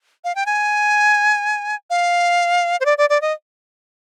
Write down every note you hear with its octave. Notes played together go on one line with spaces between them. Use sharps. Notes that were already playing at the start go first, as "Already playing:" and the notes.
F5
G5
G#5
F5
C5
D5
D5
D5
D#5